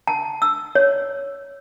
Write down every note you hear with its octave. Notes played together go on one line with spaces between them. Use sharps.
A5
E6
C#5